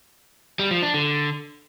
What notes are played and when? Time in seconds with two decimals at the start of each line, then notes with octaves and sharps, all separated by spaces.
0.59 G3
0.71 F3
0.82 D4
0.94 D3